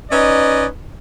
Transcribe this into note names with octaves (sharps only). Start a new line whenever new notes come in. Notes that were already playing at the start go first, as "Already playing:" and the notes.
C#4 D#4 B4 D5 D#5